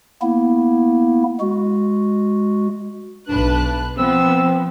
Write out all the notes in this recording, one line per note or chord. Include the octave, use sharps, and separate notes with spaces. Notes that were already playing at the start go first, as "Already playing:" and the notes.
A#3 B3 E4
G#3 F#4
B1 D4 B4 F#6
F3 B3 C4 E6